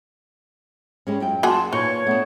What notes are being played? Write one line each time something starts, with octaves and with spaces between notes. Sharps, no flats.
G3 G#3 C#4
F#2 F4 G5
A#3 F#4 G#4 A5 C6
A#2 A#3 D#4 B4 C#5 C#6
A3 B3 D4